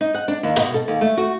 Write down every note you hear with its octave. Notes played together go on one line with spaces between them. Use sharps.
D#4
F#5
D4
D#2
B2
A4
D#2
A3
F#4